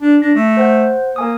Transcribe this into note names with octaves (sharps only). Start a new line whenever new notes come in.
D4
D4 A#6
A3
C5 F#5 G6
A#3 A#4 G#5 D#6